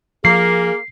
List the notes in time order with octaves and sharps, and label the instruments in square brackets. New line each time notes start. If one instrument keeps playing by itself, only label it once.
[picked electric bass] F3 [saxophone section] A#3 [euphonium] G#4 [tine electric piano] C7